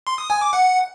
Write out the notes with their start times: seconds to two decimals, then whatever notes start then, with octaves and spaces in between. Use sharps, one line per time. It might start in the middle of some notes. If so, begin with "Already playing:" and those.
0.07 C6
0.18 D#6
0.30 G#5
0.41 D6
0.53 F#5